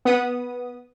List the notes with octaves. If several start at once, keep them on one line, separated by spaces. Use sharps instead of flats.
B3 D#6